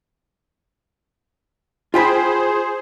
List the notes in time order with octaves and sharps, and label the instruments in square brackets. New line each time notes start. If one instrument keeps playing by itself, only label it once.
[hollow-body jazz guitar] F4 G5 B5 [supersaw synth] G#4 C5